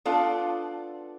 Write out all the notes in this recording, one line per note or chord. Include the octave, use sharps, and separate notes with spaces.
B3 D4 F4 A4